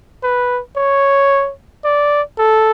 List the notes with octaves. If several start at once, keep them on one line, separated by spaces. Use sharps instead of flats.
B4
C#5
D5
A4